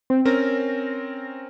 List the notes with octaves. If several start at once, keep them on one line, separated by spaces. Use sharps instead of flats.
C4
C4 C#4 A#4 A#6